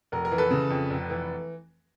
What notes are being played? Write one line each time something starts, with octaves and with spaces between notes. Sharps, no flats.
F1 A#4
A#4
E3
A4 B4
C#3
F2
F1
E3